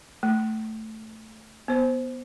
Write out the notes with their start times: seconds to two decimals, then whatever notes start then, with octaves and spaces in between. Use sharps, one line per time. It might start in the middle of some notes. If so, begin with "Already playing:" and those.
0.23 A3
1.68 B3 C5